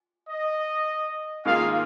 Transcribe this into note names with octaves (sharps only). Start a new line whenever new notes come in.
D#5
G#2 D#3 A#3 F4 G#4 F5